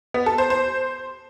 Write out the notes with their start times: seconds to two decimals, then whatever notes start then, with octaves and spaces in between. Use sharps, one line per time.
0.14 B3
0.26 A4
0.38 C5
0.50 C5